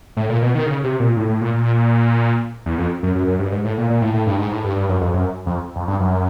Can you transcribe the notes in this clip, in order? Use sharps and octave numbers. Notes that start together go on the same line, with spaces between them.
A2
A#2
B2
D#3
C#3
C3
A#2
A2
A2
A#2
A#2
E2
F2
F#2
F#2
F#2
G2
G#2
A2
A#2
A#2
A2
A2
G2
G#2
A2
G2
G2
F#2
F2
F#2
F2
F2
G2
F#2